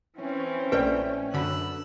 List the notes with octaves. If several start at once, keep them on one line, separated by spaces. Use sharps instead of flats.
E3 C4 C#4
A#1 A3 B4 D5 G5
F#2 D3 B5 E6 F#6